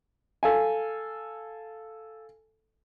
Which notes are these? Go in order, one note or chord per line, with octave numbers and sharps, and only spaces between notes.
A4 F5 G#5